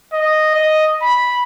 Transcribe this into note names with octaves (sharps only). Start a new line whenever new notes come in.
D#5
D#5
B5